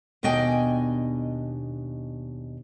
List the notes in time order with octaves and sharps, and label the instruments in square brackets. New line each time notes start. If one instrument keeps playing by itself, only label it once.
[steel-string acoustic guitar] D#2 B2 D4 D#5 G5 G#5